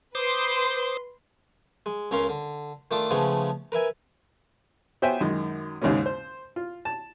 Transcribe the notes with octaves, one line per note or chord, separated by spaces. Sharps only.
B4 C5 C6 D6 D#6
G#3
C#2 C#3 C#4 A#4 F5 C6
D3
D#3 A3 D4 F4 D6
C#3 F3 G#3 A3 B3 C#4
A#4 B4 E5 G#5
B3 C5 C#5 E5 G5 G#5
F#2 D#3 G#3
D#2 G#2 C#3 G#3 A#3 C#4
C5
F4
A5